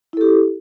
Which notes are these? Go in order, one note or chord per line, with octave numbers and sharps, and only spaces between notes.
E4 G4 A4